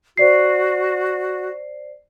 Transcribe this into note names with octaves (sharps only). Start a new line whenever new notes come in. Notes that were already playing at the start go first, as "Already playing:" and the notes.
F#4 C5 D5 C7